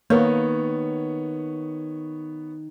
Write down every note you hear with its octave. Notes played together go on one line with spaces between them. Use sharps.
D#3 A#3 B3 C#5